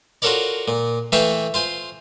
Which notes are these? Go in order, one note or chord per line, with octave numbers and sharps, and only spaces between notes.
F4 F#4 A4 A#4 C#5 D5
A#2
E3 A3 E5 F5 G5 C#6
F4 C5 G#5